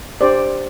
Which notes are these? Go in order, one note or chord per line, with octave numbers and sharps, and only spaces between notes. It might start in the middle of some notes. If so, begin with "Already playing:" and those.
D4 G4 C5 D5